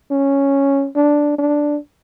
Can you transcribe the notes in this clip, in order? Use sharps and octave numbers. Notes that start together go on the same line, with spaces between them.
C#4
D4
D4